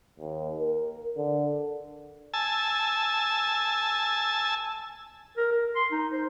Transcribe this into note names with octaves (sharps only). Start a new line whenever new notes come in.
D#2
A#4
D3
G#5 A5 E6
A#4
A#4
C6
D#4
C5